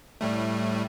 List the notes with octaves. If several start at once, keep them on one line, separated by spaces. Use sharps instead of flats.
A2 G3 A3